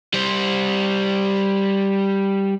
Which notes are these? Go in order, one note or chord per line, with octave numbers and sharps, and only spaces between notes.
G3 C5